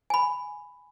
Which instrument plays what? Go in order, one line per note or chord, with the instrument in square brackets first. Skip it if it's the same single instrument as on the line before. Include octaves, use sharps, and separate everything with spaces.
[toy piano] G#5 B5